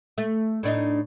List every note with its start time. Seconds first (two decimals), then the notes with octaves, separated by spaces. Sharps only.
0.18 A3
0.63 A2 D4 D#4